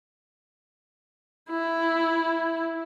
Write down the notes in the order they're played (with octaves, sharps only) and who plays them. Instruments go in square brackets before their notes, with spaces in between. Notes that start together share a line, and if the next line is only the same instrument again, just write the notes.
[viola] E4